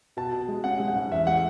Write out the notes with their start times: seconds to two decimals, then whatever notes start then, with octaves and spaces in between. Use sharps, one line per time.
0.17 B2 A5
0.32 B2
0.49 G#3
0.64 C#4 F#5
0.80 G#3
0.88 F#5
0.95 G#2
1.11 E2 E5
1.27 G#3 F#5